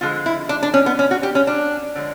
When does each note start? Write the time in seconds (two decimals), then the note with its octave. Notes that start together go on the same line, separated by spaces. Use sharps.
0.01 D3 F3 G#3 F4
0.26 E4
0.49 D4
0.63 D4
0.74 C#4
0.86 B3
0.99 C#4
1.11 F#4
1.23 G4
1.35 C#4
1.47 D4
1.95 D3 F3 G#3